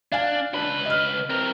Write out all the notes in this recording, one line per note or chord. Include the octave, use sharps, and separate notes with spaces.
D4 F5 G#5
C#2 D4 B4
D#5 F6
C4 A#4